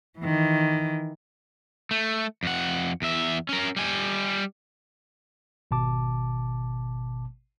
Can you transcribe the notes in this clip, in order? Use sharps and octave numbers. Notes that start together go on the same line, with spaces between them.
D#3 E3
A3
F2 F#5
E2 E5
C#4 A#4
G3 G#5
G#1 B2 A5 D6